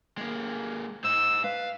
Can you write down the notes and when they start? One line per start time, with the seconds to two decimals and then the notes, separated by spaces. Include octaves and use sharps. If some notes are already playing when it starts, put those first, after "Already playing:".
0.18 G#3 A#3
1.04 G#3 C5 E6
1.44 B4 F5